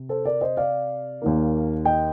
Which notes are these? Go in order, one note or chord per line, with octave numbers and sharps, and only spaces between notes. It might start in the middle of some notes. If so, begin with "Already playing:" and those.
Already playing: C3
A4 C5
A#4 D5
C5 D#5
D5 F5
D#2 D#3 A#3
D#5 G5